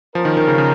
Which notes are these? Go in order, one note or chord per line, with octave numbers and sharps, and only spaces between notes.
F3 A#3 C#4 A#4
D#3
D#3
C#3
C#3